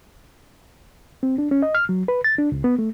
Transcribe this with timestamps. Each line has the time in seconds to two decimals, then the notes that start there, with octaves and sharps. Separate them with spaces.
1.23 C4
1.38 D4
1.51 C#4
1.62 D#5
1.75 F6
1.89 F#3
2.08 B4
2.24 A6
2.39 D4
2.52 C#2
2.64 B3
2.79 A3